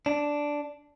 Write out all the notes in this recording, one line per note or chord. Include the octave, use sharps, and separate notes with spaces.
D4